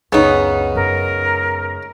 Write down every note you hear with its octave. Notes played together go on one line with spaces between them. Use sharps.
C#2 F#2 C#3 B3 D#4
F#2 G#3 A#4